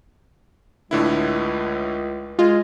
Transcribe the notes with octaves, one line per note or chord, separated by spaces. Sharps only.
C#2 A2 D3 E4
G#3 F4 G#4